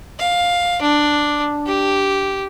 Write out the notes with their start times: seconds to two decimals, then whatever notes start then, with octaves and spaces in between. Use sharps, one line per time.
0.19 F5
0.81 D4
1.66 G4